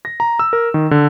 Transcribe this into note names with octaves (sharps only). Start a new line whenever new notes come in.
A#6
A#5
E6
A#4
D#3
D3